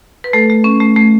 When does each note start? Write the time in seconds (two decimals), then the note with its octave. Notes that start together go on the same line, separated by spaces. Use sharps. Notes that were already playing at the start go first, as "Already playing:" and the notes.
0.24 B4
0.33 A3 A4
0.50 A3
0.64 C#4
0.80 A3
0.96 A3